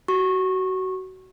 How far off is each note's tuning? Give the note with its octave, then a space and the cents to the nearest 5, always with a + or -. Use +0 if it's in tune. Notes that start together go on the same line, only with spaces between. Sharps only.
F#4 +25 C#6 -20